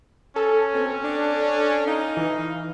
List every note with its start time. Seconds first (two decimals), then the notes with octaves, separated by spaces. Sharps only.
0.36 C#4 A4
0.74 B2 C4
1.04 D4
1.87 D#4 F5
2.17 E3